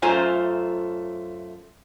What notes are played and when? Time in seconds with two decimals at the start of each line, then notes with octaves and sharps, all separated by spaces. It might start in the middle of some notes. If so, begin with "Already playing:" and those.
0.02 F#2 A3 F4 C5 G#5 A#5